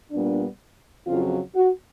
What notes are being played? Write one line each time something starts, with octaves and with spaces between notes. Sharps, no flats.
A#2 G3 B3 D4
F2 C#3 F#3 F4
F#4